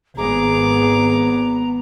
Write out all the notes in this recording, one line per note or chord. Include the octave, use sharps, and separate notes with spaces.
G#1 B3 G#4 A#5 D6